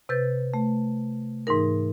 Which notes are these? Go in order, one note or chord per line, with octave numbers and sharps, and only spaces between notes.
C3 B4 G6 A6
A3
G#2 E3 D#4 A#4